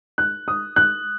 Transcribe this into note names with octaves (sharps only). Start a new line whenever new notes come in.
F#6
D#6
F#6